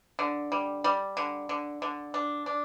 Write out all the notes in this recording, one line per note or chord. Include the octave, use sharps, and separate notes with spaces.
D3
G3
G3
D3
D3
D3
D4
D4